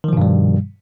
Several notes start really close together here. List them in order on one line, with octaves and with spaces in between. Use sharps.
D#3 F3 B2 G2 G3